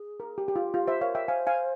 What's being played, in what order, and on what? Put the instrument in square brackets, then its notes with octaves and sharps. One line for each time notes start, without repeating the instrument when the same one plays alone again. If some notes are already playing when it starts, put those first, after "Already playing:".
Already playing: [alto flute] G#4
[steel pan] A#4
G4
G4
F4
[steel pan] F4 [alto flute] G4
[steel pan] C5 E5
[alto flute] A#4 [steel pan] C#5 F5
[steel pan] E5 G5
[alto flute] C5 [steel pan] F5 G#5
[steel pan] F5 G#5